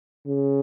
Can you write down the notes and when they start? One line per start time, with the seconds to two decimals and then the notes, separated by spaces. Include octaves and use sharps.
0.26 C#3